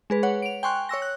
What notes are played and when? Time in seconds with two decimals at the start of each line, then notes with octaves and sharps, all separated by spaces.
0.10 G#3 G#4 B4
0.23 B4 C#5 F#5
0.42 D7 F7
0.63 G5 G#5 C6 C#6 F#6
0.89 C#5 C#6 E6 A#6
1.02 F#6